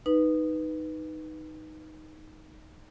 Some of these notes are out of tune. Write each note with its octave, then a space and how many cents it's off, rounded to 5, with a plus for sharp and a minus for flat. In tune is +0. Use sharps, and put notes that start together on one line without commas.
D#4 +0 B4 +0